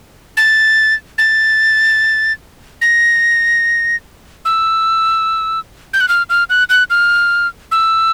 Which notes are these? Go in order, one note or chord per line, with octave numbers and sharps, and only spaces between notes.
A6
A6
A#6
E6
G6
F#6
F6
F6
F#6
F#6
F6
E6